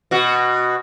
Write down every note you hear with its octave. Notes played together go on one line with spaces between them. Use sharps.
B2 F#4